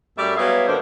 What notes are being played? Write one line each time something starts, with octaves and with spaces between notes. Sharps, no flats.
F#2 G3 A3 D5 E5
F#3 G3 B3 G#4 E5 F5
G2 D3 A#3 D4 C5